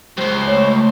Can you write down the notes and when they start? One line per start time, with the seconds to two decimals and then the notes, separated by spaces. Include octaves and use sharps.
0.17 C#2 G2 C5
0.48 A3 C#5